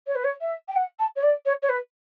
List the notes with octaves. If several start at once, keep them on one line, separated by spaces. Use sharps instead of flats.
C#5
B4
C#5
E5
G5
F#5
A5
C#5
D5
C#5
C#5
B4